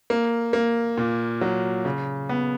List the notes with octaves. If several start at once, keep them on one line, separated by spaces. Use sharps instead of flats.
A#3
A#3
A#2
F#3
C#3
B3